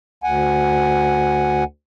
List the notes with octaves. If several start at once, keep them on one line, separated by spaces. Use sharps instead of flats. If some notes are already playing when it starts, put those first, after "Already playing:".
D2 F#5 G#5